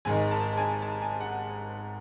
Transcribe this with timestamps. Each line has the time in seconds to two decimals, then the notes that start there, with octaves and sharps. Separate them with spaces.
0.05 G#1 G#2 D#3 G#5
0.31 A5
0.57 G#5
0.82 A5
1.02 G#5
1.20 F#5